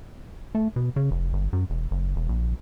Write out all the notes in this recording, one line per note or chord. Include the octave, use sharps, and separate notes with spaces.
A3
B2
C#3
F1
G1
F#2
E1
F#1
E1
A#1